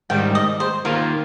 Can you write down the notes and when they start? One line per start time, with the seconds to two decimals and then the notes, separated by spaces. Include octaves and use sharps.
0.10 G#2 D#3 G3 G5
0.35 D#5
0.60 C5
0.85 D#3 A#3 F4 A#4